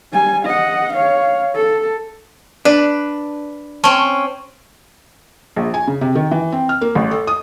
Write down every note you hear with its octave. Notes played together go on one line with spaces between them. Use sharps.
G3 G#5
D#5 F#5
C#5 F5
A4
D4 B4
C4 C#4 A5 C#6
A#1
G#5
C#3
C3
D#3
E3
C4
F6
A#3
A1
A4
D#6